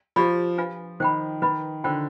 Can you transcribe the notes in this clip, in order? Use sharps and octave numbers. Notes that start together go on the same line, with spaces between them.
F3 G4 D5 F5 B5
D4 F4 B4 F5 G#5
D#3 C5 G5 B5
D#3 B4 D#5 B5
D3 F4 C5 G5